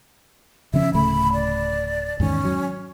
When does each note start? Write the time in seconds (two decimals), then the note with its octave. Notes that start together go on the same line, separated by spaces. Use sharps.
0.74 C#3 F3 C#4 E5
0.94 D1 C#3 A3 B5
1.33 D5
2.20 E2 G#2 D#3 C#4
2.45 F#3